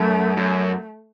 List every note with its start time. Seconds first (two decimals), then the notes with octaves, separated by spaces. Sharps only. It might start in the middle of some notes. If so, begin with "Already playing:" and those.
Already playing: F#2 A3
0.37 F#2